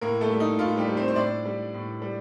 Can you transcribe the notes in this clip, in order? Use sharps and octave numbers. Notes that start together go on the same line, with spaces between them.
A2 A#3 A#4
A3 A4
G3
D#4
A2 F4
G3 G4
G3
C4 C5
C5
A2 D4 D5
G3
A2
G3